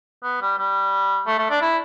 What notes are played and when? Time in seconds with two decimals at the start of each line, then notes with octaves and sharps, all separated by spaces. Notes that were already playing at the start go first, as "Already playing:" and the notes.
0.23 B3
0.41 G3
0.58 G3
1.27 A3
1.38 A3
1.50 D4
1.61 E4